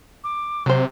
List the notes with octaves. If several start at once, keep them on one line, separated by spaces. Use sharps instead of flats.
D6
C3 F#3 C5